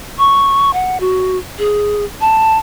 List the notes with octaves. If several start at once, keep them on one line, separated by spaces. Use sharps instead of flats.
C#6
F#5
F#4
G#4
A5